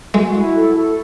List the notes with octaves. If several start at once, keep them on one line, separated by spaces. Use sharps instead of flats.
G#3 F#4
E4
A4
A4